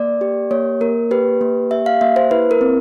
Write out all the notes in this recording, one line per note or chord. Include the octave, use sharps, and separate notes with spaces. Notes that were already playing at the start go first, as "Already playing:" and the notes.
Already playing: A#3 D5
G4
A#3 C#5
A#3 A#4
G4 B4
A#3
G4 E5
F5
A#3 E5
C5
E4 B4
A#4
C4